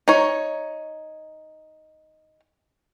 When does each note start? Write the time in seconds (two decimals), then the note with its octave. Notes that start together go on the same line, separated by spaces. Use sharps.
0.08 D#4 C#5